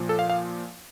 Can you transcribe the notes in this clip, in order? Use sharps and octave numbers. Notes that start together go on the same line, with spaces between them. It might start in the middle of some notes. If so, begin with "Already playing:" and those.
Already playing: A#2 F3
A4
F5
F5